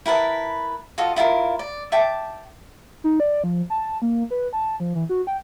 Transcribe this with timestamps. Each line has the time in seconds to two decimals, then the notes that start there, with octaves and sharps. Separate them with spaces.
0.06 E4 A#4 B4 A5
0.98 F4 F#4 A4 D#5
1.16 E4 F4 G#4 A#4
1.59 D5
1.92 E5 G5 A5 D6
3.04 D#4
3.20 D5
3.44 F3
3.70 A5
4.02 A#3
4.31 B4
4.53 A5
4.80 F3
4.95 E3
5.09 F#4
5.27 G5